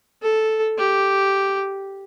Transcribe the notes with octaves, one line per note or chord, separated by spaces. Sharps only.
A4
G4